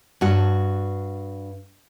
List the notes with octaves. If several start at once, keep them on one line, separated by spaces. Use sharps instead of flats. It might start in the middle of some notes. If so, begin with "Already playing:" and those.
G2 F#4